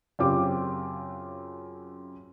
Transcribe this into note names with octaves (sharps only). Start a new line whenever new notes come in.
F#2 C#3 C4 F4 G4 D6